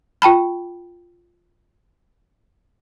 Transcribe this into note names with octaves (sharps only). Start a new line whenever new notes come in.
F4 G5 A5 B5